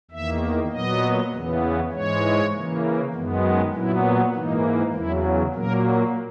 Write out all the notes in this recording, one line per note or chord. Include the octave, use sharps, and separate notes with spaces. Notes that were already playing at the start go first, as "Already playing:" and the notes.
E2 D#3 A#3 E5
A#2 F#3 B3 D#5
E2 C#3 E3 B3
G#2 E3 G#3 C#5
C#3 E3 A#3
F#2 D#3 G#3 B3
A#2 F#3 B3 E4
G#2 E3 A#3 D#4
E2 C#3 F#3 E4
A#2 F#3 A#3 A#4